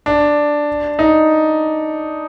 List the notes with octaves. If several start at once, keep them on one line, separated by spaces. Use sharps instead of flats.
D4
D#4